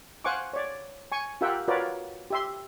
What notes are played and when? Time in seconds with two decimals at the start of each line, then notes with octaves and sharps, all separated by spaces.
0.24 C5 F5 F#5 G#5 C#6 D6
0.53 C#5 D5
1.12 G#5 C#6
1.41 F4 G4 A#4 E5 F#5 G5
1.68 F4 F#4 A#4 B4 C#5 D5
2.30 G4 E5 C6